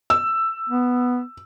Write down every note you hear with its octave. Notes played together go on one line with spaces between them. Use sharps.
E6
B3